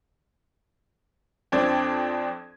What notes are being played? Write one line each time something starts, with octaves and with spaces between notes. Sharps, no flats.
F2 C4 D4 D5 G#6